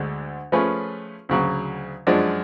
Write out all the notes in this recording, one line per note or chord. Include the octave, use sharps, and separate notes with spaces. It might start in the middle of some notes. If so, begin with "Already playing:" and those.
Already playing: D2 D3 G#3 D4
F3 A3 C#4 G#4 B4
D2 C#3 F#3
F#2 F3 G#3 D4